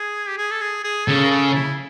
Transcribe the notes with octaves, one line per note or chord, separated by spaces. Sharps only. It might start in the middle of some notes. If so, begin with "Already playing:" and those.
Already playing: G#4
G4
G#4
A4
G#4
G#4
C#3 A4
A#4
A4
E4